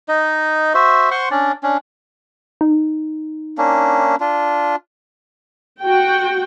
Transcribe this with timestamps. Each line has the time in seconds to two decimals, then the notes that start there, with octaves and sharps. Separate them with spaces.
0.08 D#4 D#5
0.74 F#4 C5 E5
1.11 C5 F#5 C6 C#6
1.31 C#4 D4 D5
1.63 C#4 D4
2.61 D#4
3.58 A#3 C#4 D4
4.20 D4 F4
5.82 F#4 G5